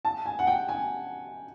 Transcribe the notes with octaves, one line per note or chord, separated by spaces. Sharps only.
A5
G#5
F#5
G5
G#5